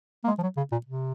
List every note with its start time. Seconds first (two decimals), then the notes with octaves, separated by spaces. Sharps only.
0.24 A#3
0.28 G#3
0.38 F3
0.43 F#3
0.57 C#3
0.72 A#2
0.86 C3